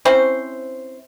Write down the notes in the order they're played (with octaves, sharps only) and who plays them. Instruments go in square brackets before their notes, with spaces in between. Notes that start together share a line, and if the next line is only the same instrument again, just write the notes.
[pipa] C4 C#4 E4 C5